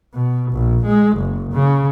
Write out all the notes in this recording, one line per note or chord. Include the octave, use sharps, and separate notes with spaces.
B2
A#1
G#3
F#1
C#3